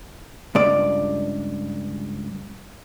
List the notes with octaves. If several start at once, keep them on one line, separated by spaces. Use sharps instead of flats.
C#2 G2 D5